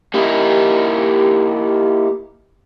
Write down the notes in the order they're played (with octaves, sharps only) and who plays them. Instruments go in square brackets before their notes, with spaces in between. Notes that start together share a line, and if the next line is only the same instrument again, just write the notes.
[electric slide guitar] A#3 D#4 E4 [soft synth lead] G4